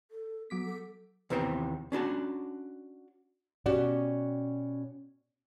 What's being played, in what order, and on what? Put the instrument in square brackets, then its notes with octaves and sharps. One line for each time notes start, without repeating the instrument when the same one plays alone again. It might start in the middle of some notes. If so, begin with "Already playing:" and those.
[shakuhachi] A4
[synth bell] F#3 D6 B6 [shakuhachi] B3
[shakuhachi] A4
[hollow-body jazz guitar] D#2 C3 E3 B3 C5 G5
C#4 D4 F#4 A5
[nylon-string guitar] B2 C#4 F#4 G4 D5